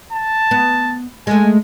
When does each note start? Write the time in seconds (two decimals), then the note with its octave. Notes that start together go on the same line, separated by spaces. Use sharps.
0.13 A5
0.51 B3
1.27 G#3 A3 G#5